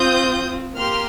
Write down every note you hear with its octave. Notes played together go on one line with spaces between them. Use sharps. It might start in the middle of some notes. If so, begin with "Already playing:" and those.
Already playing: C4 F4 D#6 G6
A#3 G4 C6 F6